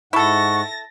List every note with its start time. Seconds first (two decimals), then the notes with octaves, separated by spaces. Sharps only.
0.13 G#2 E4 A4 F#5 C#6 A6 A#6